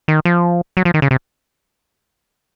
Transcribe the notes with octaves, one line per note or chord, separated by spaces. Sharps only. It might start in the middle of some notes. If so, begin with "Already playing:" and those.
D#3
F3
F#3
F3
D#3
C#3
C3